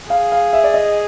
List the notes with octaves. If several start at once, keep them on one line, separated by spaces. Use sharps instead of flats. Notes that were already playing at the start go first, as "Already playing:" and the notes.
G#4 F5
F5
E5
D5
D#5